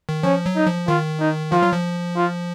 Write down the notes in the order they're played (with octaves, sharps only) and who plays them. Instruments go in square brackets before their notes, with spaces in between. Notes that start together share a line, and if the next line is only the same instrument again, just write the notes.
[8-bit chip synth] D#3
[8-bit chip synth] F3 [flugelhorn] C#4
[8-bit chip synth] F#3
[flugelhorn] D#4
[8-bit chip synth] F3
[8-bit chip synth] D#3 [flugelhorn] F4
[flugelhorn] D#4
[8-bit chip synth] F3 [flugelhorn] F4
[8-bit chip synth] F#3
F3
[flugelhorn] F4